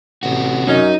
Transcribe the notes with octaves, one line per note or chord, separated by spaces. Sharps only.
A1 C3 F#4
F#2 C#4 D#4